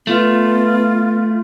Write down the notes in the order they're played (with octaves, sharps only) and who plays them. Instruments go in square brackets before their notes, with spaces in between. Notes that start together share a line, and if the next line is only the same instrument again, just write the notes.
[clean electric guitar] A3 [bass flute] B3 [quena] F4